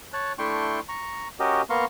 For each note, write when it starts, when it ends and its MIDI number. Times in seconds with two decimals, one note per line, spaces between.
0.13 0.32 73
0.13 0.32 81
0.13 0.32 90
0.39 0.80 57
0.39 0.80 62
0.39 0.80 64
0.39 0.80 79
0.39 0.80 84
0.39 0.80 85
0.89 1.28 82
0.89 1.28 85
1.40 1.62 61
1.40 1.62 66
1.40 1.62 67
1.40 1.62 70
1.40 1.62 75
1.70 1.85 58
1.70 1.85 59
1.70 1.85 77
1.70 1.85 82
1.70 1.85 84
1.70 1.85 85